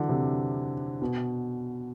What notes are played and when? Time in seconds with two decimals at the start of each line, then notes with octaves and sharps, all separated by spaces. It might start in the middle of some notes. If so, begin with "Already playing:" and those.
Already playing: D3 E3 F#3
0.09 C3
1.02 B2